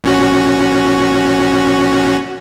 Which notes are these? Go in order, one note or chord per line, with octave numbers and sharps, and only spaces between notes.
A#1 C#4 F#4